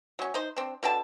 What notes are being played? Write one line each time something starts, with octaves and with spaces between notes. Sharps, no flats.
F#3 C#4
D#4 C5
C4 D4
B2 D3 G5 A5